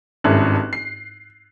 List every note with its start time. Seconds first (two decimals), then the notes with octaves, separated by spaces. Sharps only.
0.24 G#1 G2 C#4 E4 A4 F#6
0.73 C7